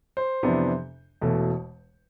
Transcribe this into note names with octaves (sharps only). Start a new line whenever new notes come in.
C5
F2 C3 E3 B3 D4
E1 E2 B2 A3